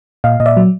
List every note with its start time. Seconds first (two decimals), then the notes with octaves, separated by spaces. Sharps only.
0.24 A#2 D#5 F5
0.40 A#2 D#5
0.46 D5 E5
0.57 F#3